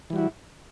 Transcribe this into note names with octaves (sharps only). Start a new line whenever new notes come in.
E3 G3 E4 F#4